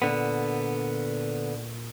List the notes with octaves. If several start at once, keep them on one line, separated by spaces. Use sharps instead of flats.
A#2 D3 B3